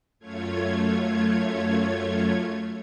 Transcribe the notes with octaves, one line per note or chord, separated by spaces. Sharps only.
F#2 A3 F4 C#5 G#6